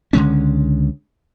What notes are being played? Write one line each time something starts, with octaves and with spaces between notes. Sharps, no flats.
C#2 D3 G#3 C#4